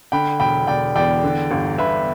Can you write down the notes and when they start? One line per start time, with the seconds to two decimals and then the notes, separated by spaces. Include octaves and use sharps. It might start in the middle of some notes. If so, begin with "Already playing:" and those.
0.12 D3 G5 B5
0.40 E1 G5 B5
0.67 E1 D5 G5
0.95 E2 D5 G5
1.24 D3
1.51 G1
1.78 G1 B4 E5